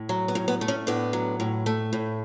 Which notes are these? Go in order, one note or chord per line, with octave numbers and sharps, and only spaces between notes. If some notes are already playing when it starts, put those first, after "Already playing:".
Already playing: A2
F#3
B3
A2
B3
A3
C#4
A2 B3 D4
F#3
A2
A3
A2